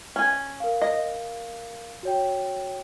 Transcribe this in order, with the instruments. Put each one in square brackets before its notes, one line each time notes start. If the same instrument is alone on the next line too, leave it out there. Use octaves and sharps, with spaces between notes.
[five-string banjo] C#4 G#5
[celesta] A#4 F5
[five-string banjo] D#5
[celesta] F#4 C#5 G5